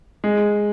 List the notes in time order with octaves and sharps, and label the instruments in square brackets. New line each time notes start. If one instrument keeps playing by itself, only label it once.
[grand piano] G#3